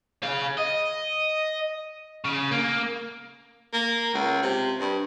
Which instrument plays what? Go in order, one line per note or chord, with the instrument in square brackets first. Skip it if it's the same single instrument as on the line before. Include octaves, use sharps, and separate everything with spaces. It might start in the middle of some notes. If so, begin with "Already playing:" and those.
[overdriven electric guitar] G#4 F5
D#5
C#3
A#3
[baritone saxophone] A#3
C#2
C3
G2